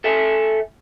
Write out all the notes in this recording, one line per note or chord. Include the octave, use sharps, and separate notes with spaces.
A4 E5 G#5